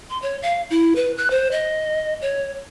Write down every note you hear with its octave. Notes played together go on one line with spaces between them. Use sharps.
C6
C#5
F5
E4
B4
F#6
C5
D#5
C#5